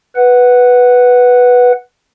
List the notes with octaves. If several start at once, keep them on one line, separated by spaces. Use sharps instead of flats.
B4 F#5